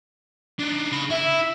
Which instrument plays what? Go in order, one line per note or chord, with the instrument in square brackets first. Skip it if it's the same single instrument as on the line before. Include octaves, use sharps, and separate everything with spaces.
[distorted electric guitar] D4 D#4
C#3 B5
[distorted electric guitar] E4 [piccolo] E5